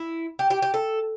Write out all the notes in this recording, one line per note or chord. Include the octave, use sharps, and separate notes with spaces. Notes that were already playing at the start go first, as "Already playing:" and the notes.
Already playing: E4
G4
G4
G4
A4